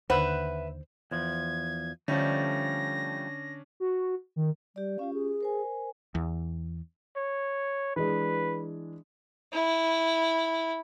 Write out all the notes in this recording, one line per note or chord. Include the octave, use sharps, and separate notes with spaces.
D#2 D3 B4 C5 E5 F#5
E2 F3 G#6
D3 F3 G3 A3 C#4 D4 A#6
F#4
D#3
G3 G4 D5
C#4 F4 G4 F5
G#4
A#4 C5 G#5
E2
C#5
E3 G#3 D4 B4
E4